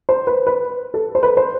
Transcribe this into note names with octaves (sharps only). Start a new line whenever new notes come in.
C5
B4
B4
A4
C5
B4
C5